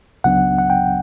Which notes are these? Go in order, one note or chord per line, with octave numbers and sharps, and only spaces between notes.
C#2 C#3 F#3 B3 D4 F#5
F#5
G5